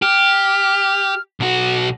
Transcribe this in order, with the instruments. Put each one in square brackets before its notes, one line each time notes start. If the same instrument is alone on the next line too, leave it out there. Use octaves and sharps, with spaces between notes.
[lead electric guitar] G4 [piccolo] F6
[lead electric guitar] B1 F#4